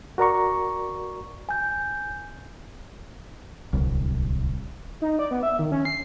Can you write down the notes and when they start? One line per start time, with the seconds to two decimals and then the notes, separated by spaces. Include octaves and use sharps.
0.18 F#4 A#4 D5 A#5 C#6
1.49 G#5 G6
3.73 D1 C2
5.02 D#4
5.19 D5
5.31 B3
5.43 E5
5.59 D#3
5.72 C#4
5.85 C7